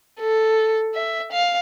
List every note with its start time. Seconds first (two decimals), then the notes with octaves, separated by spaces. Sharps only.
0.19 A4
0.94 E5
1.32 F5